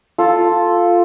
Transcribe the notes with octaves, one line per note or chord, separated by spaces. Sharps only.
F4 A4